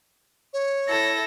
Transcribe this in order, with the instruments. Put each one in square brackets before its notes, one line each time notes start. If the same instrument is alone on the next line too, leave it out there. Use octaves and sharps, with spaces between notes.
[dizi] C#5
[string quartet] E4 A4 A#6